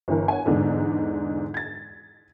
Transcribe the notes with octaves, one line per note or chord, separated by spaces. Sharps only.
G1 E3 A#4
C#5 F#5 G#5
E2 G#2 D3 D4
G#6 A6